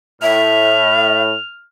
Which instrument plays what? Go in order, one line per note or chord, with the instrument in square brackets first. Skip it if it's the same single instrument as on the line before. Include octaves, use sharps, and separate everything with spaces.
[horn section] A2 [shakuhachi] E5 [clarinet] F6